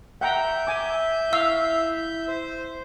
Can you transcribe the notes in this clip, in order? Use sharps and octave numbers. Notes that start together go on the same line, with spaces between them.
E5 F#5 G5 A#5 G6
G#5 D6
E4 F5 E6
C5